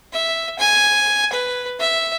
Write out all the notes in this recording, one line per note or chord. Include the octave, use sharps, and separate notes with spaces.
E5
G#5
B4
E5